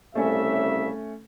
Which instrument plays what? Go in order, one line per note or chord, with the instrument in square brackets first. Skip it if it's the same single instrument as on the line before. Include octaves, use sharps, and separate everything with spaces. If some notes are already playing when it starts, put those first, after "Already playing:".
[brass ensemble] C2 C#3 E5 [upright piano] A3 C#4